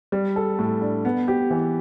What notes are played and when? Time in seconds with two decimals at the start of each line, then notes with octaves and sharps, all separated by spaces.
0.12 G3
0.36 A4
0.59 A2
0.82 D4
1.05 B3
1.28 G4
1.51 E3